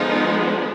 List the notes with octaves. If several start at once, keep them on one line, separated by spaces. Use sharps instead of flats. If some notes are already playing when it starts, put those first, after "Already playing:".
Already playing: D3 F3 G#3 B3 D#4 F4
D4